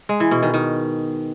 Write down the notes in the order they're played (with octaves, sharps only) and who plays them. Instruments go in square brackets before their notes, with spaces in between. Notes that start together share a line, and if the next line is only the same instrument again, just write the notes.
[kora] G#3
E3
B2
D#3
D#3